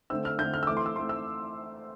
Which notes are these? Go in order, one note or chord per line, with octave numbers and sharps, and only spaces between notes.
D3 A3 C4 E6
F6
D3 A3 C4 G6
F6
E6
E3 A3 C4 D6
C6
E6
E3 A3 C4 C6
E6